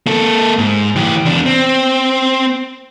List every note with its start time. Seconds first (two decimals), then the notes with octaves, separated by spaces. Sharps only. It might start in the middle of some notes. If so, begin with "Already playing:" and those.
0.06 A#3 A4
0.59 G#2
0.96 E3 G4
1.25 E2 D4
1.46 C4